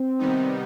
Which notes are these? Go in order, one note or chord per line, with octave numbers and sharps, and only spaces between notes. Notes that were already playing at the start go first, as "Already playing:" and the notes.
Already playing: C4
C3 D#3 G3 B3 D#4